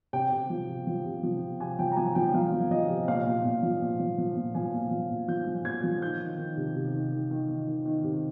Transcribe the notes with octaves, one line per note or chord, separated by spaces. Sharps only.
C3 G5
C3
F3
C3
F3
C3
F3
C3
C3 G#5
F3 G5
A#5
F3 G#5
F3 G5
F3 F5
F3
F3 D#5
C3
A#2 F5
A#2
A#2
F3
A#2
F3
F3
A#2
F3 G#5
A#2
F3
A#2
F3 G6
F3
A#2 G#6
F3
D#3 G6
D#3
D#3
C3
C3
D#3
D#3
D#3
D#3
D#3
D#3
C3